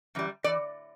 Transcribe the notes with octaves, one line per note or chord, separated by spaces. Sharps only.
F#2 E3 G3
E3 D5